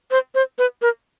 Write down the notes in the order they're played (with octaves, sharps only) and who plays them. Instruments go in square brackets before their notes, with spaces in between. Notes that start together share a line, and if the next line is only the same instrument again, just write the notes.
[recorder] C5
C5
B4
A#4